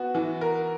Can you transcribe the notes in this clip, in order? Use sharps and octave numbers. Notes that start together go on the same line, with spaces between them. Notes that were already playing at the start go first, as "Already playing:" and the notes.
Already playing: B3 F#4
E3
A#4